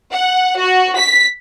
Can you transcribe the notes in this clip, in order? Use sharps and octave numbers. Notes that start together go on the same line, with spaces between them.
F#5
F#4
B6